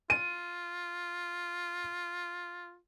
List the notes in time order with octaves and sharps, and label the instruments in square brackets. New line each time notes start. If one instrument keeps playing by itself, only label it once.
[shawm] F4 [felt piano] D#7